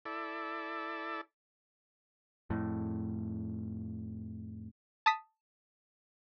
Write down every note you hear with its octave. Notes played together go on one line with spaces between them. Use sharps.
E4 A4 D5
F2 A2
A5 D#6 B6